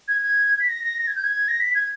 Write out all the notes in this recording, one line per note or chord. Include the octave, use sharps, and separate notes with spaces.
G#6
G#6
B6
A#6
A#6
A#6
G#6
G6
G#6
A#6
B6
G#6